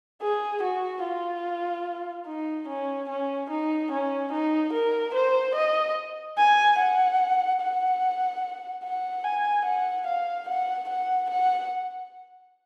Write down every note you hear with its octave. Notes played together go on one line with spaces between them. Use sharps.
G#4
F#4
F4
D#4
C#4
C#4
D#4
C#4
D#4
A#4
C5
D#5
G#5
F#5
F#5
F#5
G#5
F#5
F5
F#5
F#5
F#5